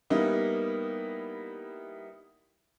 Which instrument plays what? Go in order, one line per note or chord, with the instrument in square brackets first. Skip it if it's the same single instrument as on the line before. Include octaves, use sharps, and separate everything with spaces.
[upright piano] G3 A#3 B3 D#4 E4